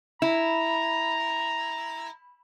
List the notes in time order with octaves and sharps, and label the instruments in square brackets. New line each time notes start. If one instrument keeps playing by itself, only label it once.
[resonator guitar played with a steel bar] E4 [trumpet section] A#5